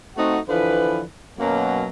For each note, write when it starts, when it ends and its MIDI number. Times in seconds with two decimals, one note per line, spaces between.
0.17 0.38 57
0.17 0.38 60
0.17 0.38 63
0.17 0.38 66
0.17 0.38 78
0.49 1.03 50
0.49 1.03 52
0.49 1.03 53
0.49 1.03 71
1.38 1.88 42
1.38 1.88 47
1.38 1.88 54
1.38 1.88 58